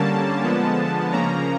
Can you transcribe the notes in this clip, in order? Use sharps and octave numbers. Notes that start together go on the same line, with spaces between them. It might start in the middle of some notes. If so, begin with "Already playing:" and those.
Already playing: D3 G3 A#3 C#4 A5
D3 F3 G#3 B3
C#3 F3 A#3 C#4 A#5